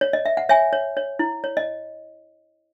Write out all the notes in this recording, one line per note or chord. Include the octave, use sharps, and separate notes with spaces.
C#5
D#5
E5
F#5
C#5 E5 G#5
C#5
C#5
E4
C#5
D#5